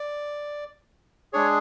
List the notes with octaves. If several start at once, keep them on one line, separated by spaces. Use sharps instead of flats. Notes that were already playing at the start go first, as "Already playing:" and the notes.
Already playing: D5
G#3 D4 G#4 C#5